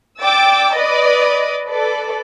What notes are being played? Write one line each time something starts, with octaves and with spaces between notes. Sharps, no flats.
D5 G5 D6 E6 A6
B4 D5 D#5 D#6
A4 B4 D5